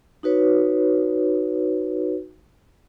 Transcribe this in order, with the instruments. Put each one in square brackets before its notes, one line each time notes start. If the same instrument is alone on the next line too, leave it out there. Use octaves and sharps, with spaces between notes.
[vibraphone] D#4 F#4 B4 C#5